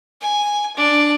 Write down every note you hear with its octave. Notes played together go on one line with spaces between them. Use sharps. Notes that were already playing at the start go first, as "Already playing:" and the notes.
G#5
D4